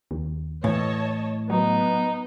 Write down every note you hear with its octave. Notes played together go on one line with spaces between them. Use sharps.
D#2
A2 E3 C#5 D#5 A5
F#3 B3 D#4